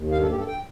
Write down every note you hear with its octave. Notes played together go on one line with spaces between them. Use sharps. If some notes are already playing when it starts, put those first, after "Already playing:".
Already playing: D#2
G2 F5
A4
G2 G4
A4
G5